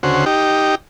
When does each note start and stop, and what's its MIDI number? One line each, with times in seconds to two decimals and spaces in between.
0.03 0.25 38
0.03 0.25 49
0.03 0.25 66
0.03 0.25 72
0.26 0.75 63
0.26 0.75 67